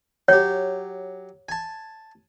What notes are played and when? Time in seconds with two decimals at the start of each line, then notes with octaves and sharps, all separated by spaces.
0.28 F#3 G4 C#5
1.49 G#5 A5